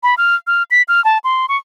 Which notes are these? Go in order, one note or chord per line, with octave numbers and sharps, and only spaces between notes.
B5
F6
F6
B6
F6
A5
C6
C#6